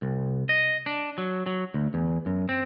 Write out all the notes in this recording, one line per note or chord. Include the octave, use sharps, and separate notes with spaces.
C2
D#5
D4
F#3
F#3
D2
E2
F#2
C4